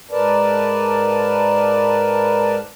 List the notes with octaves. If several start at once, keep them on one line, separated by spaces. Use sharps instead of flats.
G#2 A#4 B4 D5 A5